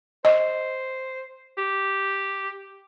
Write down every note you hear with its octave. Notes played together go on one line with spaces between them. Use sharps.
C5 D#5
G4